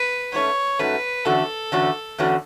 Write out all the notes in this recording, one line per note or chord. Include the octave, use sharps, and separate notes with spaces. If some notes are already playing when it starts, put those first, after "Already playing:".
Already playing: B4
G#2 F#3 A3 C#4 C#5
G#2 F#3 A3 C#4 B4
E2 D3 A3 C#4 F#4 A4
E2 D3 A3 C#4 F#4
E2 D3 A3 C#4 F#4